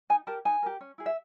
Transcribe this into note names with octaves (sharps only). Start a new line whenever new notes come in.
D#4 G#5
G4 A#4 A5
D#4 G#5
G4 A#4
C#4
E4 G#4
E5